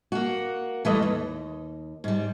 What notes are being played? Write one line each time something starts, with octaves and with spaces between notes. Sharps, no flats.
A#3 F#4
E3 G3 A3 B4 D#5
D#2
G#2 G3